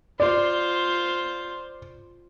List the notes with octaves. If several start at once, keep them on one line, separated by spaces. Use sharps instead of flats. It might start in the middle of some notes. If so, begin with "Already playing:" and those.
F4 C5 D5